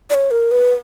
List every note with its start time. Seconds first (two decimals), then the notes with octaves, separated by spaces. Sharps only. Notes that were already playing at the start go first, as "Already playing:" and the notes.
0.10 D5
0.14 C#5
0.31 A#4
0.51 B4